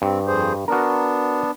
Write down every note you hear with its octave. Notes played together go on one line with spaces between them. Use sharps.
G2 C4
F2 G#4 C5
B3 D4 F#4 A#4